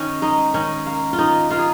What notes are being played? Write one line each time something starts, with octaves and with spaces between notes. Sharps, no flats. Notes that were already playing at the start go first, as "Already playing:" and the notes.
Already playing: D#3 C#4
G#3 D#4
D#3 C#4
A#3
F4
D#3 D#4
A#3 F4
G#4